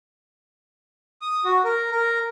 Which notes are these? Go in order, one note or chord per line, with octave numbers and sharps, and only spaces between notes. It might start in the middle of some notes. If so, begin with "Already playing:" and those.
D#6
F#4
A#4
A#4